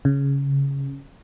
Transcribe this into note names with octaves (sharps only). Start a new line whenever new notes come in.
C#3